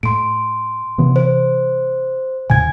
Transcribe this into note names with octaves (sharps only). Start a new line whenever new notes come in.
A2 C6 D7
C3 E3 B3
C5
D#2 A2 C#3 G#5 G#6